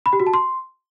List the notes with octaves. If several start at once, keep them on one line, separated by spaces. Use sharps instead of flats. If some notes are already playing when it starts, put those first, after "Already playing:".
B5
G4
F#4
A5
C6